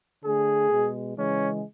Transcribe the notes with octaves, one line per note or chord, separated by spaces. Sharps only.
D3 A3 G#4
B2 G#3
C#3 E3 G#3 C#4